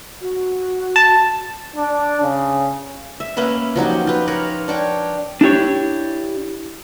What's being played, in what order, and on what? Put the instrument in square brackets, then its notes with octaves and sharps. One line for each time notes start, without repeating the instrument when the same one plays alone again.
[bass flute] F#4
[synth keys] A5
[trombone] D4
C#3
[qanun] E5
A#3 C#4 B4 E5
F3 F#3 D#4 G4
F4 B4
A#4 B4 C#5
D4 C#5 G5
[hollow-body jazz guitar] D4 E4 G4 C#5